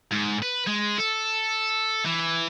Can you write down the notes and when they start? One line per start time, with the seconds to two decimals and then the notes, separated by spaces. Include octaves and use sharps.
0.11 G#2
0.42 B4
0.67 G#3
0.99 A4
2.06 E3